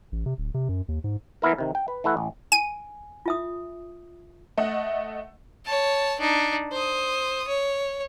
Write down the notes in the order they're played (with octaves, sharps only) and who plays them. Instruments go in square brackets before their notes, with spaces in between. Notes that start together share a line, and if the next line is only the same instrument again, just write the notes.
[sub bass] A1
C3
D1
C3
F#2
D#2
G#2
[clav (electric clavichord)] E3 B3 E4 A#4
C3 D#3
G5
B4
E3 A3 E4 F#5
A1
[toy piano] G#5 [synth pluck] D#7
[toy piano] F4 E5 D#6
[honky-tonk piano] A3 D#5 F#5
[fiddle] C#5 A5
D4 D#4
C5 D#6
C#5